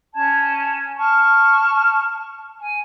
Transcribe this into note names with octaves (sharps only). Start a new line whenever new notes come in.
C#4 A5 G#6
A5 C#6 F6
G#5